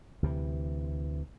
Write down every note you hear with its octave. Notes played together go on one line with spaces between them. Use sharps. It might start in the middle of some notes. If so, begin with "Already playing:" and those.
D2 C3 E3